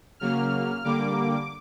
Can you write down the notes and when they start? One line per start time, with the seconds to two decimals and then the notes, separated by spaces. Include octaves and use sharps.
0.20 C#3 F#3 A#3 F6
0.84 D3 G3 A#3 D6